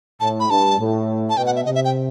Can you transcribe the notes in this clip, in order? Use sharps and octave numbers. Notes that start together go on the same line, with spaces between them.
A2 A5
B5
G2 A5
A2
A5
B2 G5
F#5
E5
C3 D#5
E5
G5